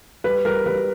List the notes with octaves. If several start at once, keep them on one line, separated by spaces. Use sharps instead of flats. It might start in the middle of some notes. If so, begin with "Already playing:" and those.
G3 B4
G3 A#4
G3 B4